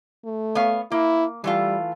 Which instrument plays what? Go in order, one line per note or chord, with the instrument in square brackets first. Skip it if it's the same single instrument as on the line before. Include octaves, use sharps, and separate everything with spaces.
[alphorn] A3
[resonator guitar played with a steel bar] B3 C#5 F5
[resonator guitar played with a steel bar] A#3 [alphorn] E4
[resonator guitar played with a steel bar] E3 A3 F4 [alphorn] G3